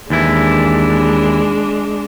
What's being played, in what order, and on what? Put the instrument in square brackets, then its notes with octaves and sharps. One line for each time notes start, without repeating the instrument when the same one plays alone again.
[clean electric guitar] D#2 E3 E4 [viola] G#3 D4